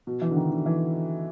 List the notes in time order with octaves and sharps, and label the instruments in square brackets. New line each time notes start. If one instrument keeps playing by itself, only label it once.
[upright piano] B2
E3
D3
D#3
D3
E3